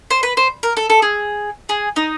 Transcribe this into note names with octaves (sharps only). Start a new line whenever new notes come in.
C5
B4
C5
A#4
A4
A4
G#4
G#4
D#4